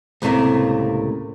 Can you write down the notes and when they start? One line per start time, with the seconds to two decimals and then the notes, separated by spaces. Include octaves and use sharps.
0.22 C#2 A2 C3 A3 A#3